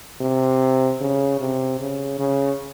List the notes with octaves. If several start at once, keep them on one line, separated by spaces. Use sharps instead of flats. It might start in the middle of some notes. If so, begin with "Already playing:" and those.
C3
C#3
C3
C#3
C#3